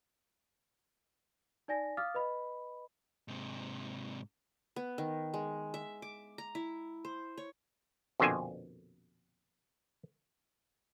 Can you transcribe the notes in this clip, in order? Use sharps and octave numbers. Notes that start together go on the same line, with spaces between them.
D#4 D5 G#5 A#6
F5 D6 D#6 F6 A6
B4 D#5 B5
G#2 C3
B3
D#3
G#3
E5
D6
A#5
E4
C5
C#5
A#1 F2 B2 D3 C5 G#5